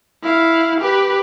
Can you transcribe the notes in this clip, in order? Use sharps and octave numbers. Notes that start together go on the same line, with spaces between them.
E4 F5
G4 B4